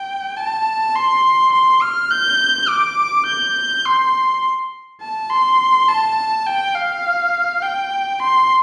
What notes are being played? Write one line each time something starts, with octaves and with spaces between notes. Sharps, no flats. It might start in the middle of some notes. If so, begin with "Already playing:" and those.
Already playing: G5
A5
C6
C6
F6
G6
D6
G6
C6
A5
C6
A5
G5
F5
G5
C6